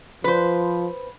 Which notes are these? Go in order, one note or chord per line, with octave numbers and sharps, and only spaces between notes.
F3 B4 C5